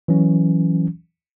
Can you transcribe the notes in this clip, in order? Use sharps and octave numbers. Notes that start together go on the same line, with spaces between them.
E3 F#3 C#4